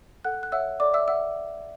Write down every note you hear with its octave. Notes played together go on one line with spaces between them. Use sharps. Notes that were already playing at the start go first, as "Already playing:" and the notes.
A4 F#5 F#6
F#6
C#5 E5 F#5 E6
A4 D5 D6
E5 E6
E5 F#5 E6